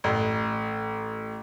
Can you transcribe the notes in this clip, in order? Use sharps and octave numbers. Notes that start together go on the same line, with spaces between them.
A1